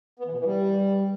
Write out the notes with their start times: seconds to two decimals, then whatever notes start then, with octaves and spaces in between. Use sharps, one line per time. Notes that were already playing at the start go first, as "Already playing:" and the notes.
0.19 B3
0.26 E3
0.32 B2
0.39 E3
0.45 G3